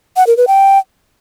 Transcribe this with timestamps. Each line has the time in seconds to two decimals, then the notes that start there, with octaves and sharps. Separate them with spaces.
0.17 F#5
0.27 A#4
0.37 B4
0.47 G5